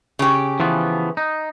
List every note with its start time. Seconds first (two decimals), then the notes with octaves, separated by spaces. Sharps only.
0.19 C#3 G4
0.60 E3 F3 B3
1.17 D#4